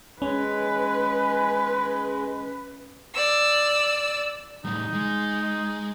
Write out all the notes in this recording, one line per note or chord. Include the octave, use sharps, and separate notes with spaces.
G#3 C#4 B4
D5 E6
A2 G3 D#4
G#3